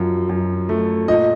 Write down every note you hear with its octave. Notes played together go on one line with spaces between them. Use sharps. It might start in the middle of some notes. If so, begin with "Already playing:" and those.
Already playing: F#2 F3
F#2
A3
A#2 D#5